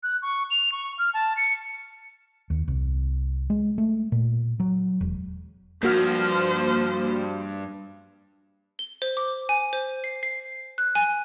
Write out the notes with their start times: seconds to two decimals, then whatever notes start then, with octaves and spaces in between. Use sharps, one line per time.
0.03 F#6
0.22 C#6
0.51 F7
0.72 C#6
0.98 F6
1.14 A5
1.37 C#7
2.50 D#2
2.68 C2
3.50 G#3
3.78 A3
4.12 A#2
4.60 F#3
5.01 E1
5.83 G2 F3 A#3 F#4 C5 F6
8.79 G7
9.02 C5
9.17 D6
9.49 G#5
9.73 C5
10.04 C7
10.23 C7
10.78 F#6
10.95 G#5